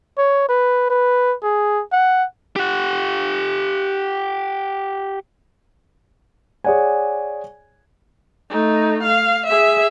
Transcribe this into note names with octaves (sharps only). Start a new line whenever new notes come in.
C#5
B4
B4
G#4
F#5
G4 F#5
G#4 C#5 D5 F#5 G#5
A3 D#4
F5
G#4 E5